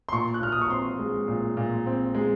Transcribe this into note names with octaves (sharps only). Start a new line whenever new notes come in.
C6
A#2 C#6
F#6
A#2 F6
D#6
C#6
C4 C6
G#3
A#2
A#2
C4
G#3